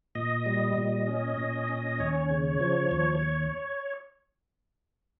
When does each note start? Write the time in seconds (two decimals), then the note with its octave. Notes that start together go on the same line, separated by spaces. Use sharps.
0.15 A#2 D#5
0.46 G3
0.76 A#2
1.07 C#4
1.38 A#2
1.69 C#4
1.99 D#2 C#5
2.31 C#3
2.60 F3
2.91 D#2